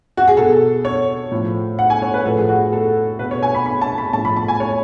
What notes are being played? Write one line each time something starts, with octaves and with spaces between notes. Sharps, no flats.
F#4
G#4
B2 A4
C#5
A2 F3
F#5
G#5
C#5
B4
A2 F3 A4
G#4
F#4
A4
B2 B4
C#5
G#5
B5
B5
A5
B5
A2 F3 A5
B5
A5
G#5
C#5